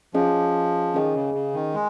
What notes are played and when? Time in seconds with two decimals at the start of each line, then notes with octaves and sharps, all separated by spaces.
0.14 F3 C#4 G#4 D#5
0.94 D#3 C#4 G#4 D#5
1.14 C#3
1.34 C#3
1.54 D#3
1.74 G#3